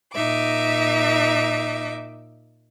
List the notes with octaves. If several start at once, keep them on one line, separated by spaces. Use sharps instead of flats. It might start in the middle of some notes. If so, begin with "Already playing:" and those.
A#2 D#4 E5 D6